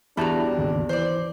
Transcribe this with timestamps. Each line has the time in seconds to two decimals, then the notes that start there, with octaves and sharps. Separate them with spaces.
0.17 E2 G3 D4 E4 F#4 A5 A#5
0.58 G#1 D#2 C#3
0.89 E3 C5 D5